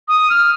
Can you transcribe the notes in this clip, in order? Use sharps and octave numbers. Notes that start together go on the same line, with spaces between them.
D#6
F6